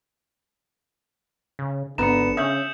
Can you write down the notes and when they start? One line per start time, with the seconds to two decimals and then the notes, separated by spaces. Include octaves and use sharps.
1.59 C#3
1.98 G#1 D3 B3 A#5 C#7 E7
2.37 C#3 C#4 E5 D#6 G6 F#7